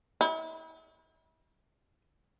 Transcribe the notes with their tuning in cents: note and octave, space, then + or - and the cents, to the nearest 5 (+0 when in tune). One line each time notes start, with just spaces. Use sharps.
E4 -40